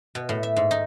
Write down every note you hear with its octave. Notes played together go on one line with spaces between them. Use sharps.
B2
A2
E5
G#2
D#4